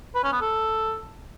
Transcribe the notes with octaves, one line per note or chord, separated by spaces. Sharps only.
B4
C#4
B3
A4